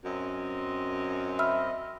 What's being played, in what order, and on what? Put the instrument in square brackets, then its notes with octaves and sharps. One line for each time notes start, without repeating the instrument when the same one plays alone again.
[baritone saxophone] F#2 [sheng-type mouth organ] C4 D#5
[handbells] E5 [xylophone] B5 E6 F6